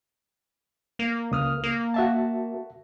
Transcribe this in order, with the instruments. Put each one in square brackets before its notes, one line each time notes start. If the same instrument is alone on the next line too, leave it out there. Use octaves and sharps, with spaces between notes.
[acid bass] A#3
[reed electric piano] C#2 D#6 F6
[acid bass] A#3
[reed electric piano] F#4 E5 A5